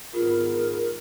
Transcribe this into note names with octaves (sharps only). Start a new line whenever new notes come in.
G#2 D#3 B3 F4 G#4 A#4